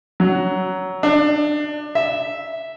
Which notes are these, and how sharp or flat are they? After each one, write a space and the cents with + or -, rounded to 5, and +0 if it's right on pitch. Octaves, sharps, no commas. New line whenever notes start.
F#3 +15
D4 +25
E5 -5